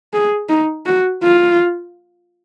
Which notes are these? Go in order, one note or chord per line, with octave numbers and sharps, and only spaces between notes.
G#4
D#4
F#4
F4